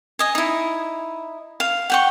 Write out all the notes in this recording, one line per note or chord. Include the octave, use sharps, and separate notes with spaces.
D#5 G#5
D#4 E4
F5
F#5 G5 C#6